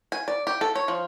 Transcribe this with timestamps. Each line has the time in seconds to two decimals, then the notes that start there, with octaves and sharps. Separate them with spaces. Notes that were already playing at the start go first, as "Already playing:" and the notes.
0.12 G#5
0.28 D5
0.47 G4
0.61 A4
0.75 C#5
0.88 F3